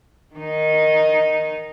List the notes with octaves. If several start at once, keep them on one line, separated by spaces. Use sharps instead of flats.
D#3 D#4